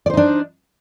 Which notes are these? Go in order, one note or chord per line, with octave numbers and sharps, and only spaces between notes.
D4 D#4 C5 D5